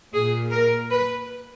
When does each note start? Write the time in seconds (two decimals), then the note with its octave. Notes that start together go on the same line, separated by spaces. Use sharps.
0.13 A#2 G#4
0.52 A#4
0.90 B4